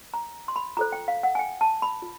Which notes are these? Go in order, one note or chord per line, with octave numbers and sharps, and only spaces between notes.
A#5
C6
B5
F4 A4 C5 A#5
G5
F5
F#5
G#5
G5
A5
B5
F4